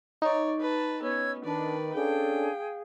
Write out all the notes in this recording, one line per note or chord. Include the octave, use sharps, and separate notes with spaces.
D#4 C#5 D5
B4 A5
B3 C#4 C#5 E6 G#6
D#3 D4 B4 D5
C#4 D4 G#4 A4 F5 G5